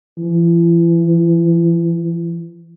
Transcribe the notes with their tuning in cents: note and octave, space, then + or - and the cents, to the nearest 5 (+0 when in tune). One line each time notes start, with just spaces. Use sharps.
E3 +35